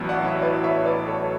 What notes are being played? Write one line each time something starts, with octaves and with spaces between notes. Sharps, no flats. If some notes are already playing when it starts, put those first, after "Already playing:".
Already playing: A1 A2 F#3 B3 E4
D5 F#5
C#5 E5
B4 D5
C#5 E5
B4 D5
A4 C#5